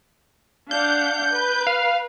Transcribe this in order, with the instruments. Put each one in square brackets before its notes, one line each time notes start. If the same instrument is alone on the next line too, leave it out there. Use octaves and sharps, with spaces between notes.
[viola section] D4 F5 F#5 [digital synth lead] G6
[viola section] B4
[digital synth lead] F5